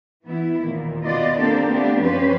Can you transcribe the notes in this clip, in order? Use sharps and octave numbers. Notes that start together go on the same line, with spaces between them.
E3 B3 E4
D#2 A#2
D#2 B2 B3 F4 D5 D#5
A#3 C4 D4 G4 A4
A3 B3 C4 D4 F4 G4
F#2 F3 C#4 G4 B4 C5